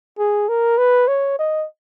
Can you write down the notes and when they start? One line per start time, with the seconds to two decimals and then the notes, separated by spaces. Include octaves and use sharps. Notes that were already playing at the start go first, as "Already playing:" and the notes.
0.19 G#4
0.49 A#4
0.78 B4
1.08 C#5
1.39 D#5